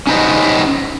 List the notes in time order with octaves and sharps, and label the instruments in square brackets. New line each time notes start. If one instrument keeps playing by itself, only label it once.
[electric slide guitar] C#4 D#4 G4 B4 C5 D#5